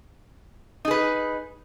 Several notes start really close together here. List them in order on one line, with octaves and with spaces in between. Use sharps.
D#4 G#4 B4